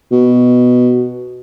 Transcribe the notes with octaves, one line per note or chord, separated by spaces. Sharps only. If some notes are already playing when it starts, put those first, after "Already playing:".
B2